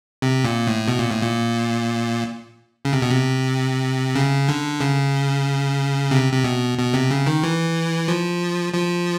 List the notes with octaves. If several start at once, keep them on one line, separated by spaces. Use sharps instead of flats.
C3
A#2
A2
B2
A#2
A2
A#2
C#3
C3
B2
C3
C#3
D3
C#3
C3
C3
B2
B2
C3
C#3
D#3
E3
F3
F3